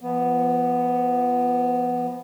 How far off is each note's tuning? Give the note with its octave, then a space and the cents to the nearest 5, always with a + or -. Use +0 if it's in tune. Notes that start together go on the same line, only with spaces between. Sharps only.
F3 -30 B3 +0